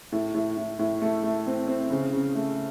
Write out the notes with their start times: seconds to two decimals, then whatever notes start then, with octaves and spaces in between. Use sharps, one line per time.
0.12 A2
0.34 A2
0.57 A2
0.79 A2
1.02 A3
1.24 A3
1.47 C4
1.68 C4
1.90 C#3
2.13 C#3
2.35 A3